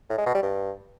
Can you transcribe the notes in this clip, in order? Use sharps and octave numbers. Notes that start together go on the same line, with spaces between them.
A2
G#3
B2
G3
G2